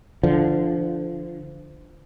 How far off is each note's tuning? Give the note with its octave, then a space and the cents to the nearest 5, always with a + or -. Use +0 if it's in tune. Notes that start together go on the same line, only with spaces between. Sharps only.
D3 +0 F3 -25